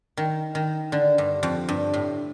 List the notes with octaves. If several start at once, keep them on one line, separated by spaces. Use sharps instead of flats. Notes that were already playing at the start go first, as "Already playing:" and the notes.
D#3
D#3
D3
G2
F2
G2
A2